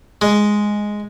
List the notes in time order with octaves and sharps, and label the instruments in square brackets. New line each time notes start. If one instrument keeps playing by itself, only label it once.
[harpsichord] G#3